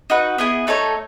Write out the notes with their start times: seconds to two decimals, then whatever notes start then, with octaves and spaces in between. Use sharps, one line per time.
0.10 D#4 F#4 B4
0.38 B3 E4 G#4 D#5
0.67 A3 D#4 A4 C#5